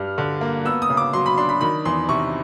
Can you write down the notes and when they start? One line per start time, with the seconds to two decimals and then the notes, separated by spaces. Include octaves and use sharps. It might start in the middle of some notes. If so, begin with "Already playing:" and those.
Already playing: G2 G3 F6
0.18 D3
0.41 A#3
0.65 B3 E6
0.82 D#6
0.89 C#3
0.97 D6
1.13 F#3 C6
1.26 B5
1.38 D4 C6
1.49 B5
1.61 D#3 B5
1.85 E2 C6
2.08 C3 C#6